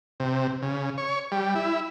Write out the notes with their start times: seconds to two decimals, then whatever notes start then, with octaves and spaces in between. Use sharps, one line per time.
0.20 C3
0.62 C#3
0.98 C#5
1.32 G3
1.55 E4